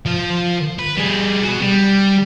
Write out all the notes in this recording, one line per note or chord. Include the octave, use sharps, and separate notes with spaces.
F3 F5
B4
G3 G#4
B3 F#4
G3